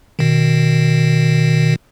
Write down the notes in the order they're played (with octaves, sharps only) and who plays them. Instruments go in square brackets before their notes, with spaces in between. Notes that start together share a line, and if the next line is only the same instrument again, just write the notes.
[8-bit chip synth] B2 D#3